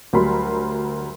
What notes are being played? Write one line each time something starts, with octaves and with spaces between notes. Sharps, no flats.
D2 F#3 G3 A#4 B5 C6